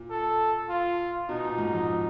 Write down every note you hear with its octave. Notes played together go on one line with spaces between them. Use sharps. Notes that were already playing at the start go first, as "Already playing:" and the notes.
Already playing: A#2
A4
F4
B2 D#4
A#2
G#2
F2